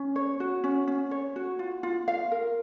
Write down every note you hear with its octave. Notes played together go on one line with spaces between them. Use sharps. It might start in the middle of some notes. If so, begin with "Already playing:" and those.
Already playing: C#4
C#5
F#4
C#4
C#4
C#5
F#4
F4
F4
F5
A#4